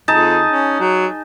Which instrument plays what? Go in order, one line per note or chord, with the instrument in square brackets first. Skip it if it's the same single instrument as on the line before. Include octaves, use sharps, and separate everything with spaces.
[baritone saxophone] F2 [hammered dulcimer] D#4 G#4 A5
[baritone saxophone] C#4
F#3